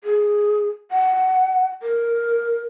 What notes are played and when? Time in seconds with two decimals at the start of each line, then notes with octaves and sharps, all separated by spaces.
0.04 G#4
0.91 F#5
1.83 A#4